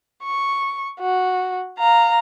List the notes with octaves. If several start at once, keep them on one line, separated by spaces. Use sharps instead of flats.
C#6
F#4
F5 A#5